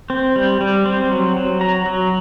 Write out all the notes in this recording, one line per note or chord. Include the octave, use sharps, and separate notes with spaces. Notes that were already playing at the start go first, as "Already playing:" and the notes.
C4
G3
G3
C4
F#3
F#3
F#3 A#5
F#3